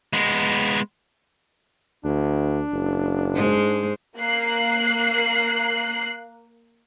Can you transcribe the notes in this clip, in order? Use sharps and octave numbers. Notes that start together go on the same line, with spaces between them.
G#3 B3
D2 D4
F#1
G#2 G#3 C5
A#3 F#6 C7